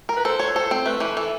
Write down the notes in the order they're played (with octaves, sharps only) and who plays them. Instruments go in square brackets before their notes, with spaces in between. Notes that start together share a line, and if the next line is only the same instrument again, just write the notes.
[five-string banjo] A#4
[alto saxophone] B4
[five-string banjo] A4 [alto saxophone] C5
[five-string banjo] C#5
[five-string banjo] A4 [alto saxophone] C5
[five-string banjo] C4
[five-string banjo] A3 [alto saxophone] B4
[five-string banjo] E3
[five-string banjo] E3 [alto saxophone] A4